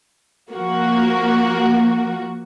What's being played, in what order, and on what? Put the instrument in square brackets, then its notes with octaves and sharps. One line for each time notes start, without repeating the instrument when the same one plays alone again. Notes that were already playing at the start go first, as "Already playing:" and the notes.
[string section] F3 A#3 F#4